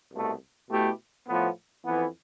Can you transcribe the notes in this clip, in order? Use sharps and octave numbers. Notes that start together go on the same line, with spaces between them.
C2 B2 A3
B2 A3 E4 G4
A2 F3 B3
F2 E3 B3